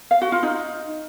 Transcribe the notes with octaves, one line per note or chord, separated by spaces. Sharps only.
F5
F#4
F4
D#4